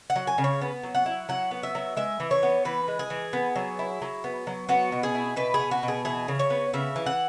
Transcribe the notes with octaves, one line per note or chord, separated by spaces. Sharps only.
F#5
F#3
G#5
C#3
C#5
B3
F#3
F#5
E4
F#3 F#5
B3
E5
F#3
G#3 E5
E3
C#5
B3
E3 B4
G#3
G#4
E3
B3
F#3
E4
F#3
B3
F#3
B3 F#4
B2
G#4
E4
B2 B4
G#4
B3
F#4
B2
G#4
E3 G#4
C#3
C#5
B3
C#3 E5
E3
F#5